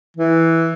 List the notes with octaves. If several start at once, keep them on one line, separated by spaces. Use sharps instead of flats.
E3